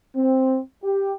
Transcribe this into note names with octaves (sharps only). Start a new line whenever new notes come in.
C4
G4